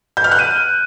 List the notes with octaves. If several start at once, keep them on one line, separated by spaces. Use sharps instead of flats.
G6
F6
F#6
D#7